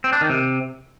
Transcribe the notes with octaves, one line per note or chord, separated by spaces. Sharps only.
C4
D4
D#3
C3